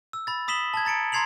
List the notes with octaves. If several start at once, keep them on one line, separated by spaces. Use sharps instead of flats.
E6
B5 A6
B5 D#6 B6 E7 F#7 G7
A5 G#6
A#5 A6 C#7 D7
A#5 C6 G#6 C7 F7 F#7